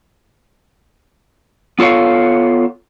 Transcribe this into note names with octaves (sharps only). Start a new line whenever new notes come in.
B3 F4 A4 C#5 F5